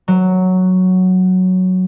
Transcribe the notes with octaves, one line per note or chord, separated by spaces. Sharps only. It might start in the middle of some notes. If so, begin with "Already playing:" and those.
F#3